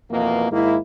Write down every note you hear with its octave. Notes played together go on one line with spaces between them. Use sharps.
F2 B2 E3 A#3
G#2 D#3 A#3 E4